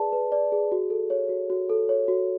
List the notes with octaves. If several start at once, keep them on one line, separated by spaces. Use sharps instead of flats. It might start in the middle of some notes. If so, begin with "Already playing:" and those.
Already playing: G#4 B4 D5 A5
B4
D5
G#4
F#4
A4
C#5
F#4
F#4
A4
C#5
F#4